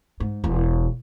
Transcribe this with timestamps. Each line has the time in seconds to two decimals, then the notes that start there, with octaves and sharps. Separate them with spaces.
0.20 G#2
0.44 E1 E2